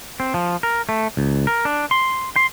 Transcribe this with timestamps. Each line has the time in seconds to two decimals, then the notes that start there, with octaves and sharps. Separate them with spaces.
0.20 C4
0.34 F3
0.63 A#4
0.89 A3
1.17 C#2
1.47 A#4
1.65 D4
1.91 C6
2.36 C6